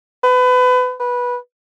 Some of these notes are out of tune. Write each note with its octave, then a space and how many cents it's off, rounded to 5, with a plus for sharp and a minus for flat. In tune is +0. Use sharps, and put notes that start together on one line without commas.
B4 +30
B4 -15